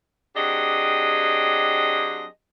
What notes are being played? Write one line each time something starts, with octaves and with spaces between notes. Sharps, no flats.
F#3 C4 D4 G4 G#4 D#5